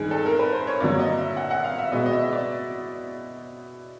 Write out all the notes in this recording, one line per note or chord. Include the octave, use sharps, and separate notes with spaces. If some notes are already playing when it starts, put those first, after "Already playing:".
Already playing: G2 D#3 G#3 G#4
A4
A#4
B4
C5
C#5
G2 D3 F#3 A#3 D5
D#5
E5
F#5
F#5
F5
E5
B2 G#3 B3 D#5
D#5
E5
D#5
D5